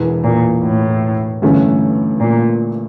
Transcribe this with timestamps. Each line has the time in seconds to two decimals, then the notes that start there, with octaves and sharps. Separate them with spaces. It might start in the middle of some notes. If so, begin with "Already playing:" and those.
Already playing: E1 E2 E3
0.24 A#2
0.64 A2
1.42 G1 G2 E3 A3 C#4
2.21 A#2